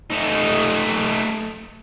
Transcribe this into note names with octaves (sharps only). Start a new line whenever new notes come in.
A3 D#4